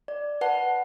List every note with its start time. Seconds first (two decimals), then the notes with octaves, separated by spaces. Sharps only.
0.08 D5
0.41 B4 F#5 A5